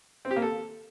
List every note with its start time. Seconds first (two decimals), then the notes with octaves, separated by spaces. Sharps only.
0.25 C4
0.31 G4
0.36 A#3
0.42 A4